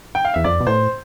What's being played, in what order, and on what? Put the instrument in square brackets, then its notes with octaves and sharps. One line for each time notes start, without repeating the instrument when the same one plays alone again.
[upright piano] G5
F5
[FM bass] E2 [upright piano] E5
[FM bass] F2 [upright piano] D5
[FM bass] B2
[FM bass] A2 [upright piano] C5